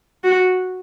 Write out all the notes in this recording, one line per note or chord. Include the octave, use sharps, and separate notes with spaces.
F#4